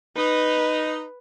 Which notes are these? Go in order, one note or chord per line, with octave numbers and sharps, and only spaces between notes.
D#4 B4